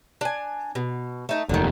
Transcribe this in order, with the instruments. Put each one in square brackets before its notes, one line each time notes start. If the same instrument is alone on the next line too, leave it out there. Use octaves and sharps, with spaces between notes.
[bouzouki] D4 G#5
B2
A3 D#4 A5
[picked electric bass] F1 D#2 [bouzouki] D3 D#3